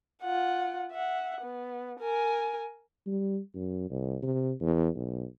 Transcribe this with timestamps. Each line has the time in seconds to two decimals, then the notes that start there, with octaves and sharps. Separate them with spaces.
0.22 F4 F#5
0.92 E5 F#5
1.41 B3
2.00 A#4 G#5
3.06 G3
3.54 F#2
3.90 C2
4.22 C3
4.61 E2
4.95 B1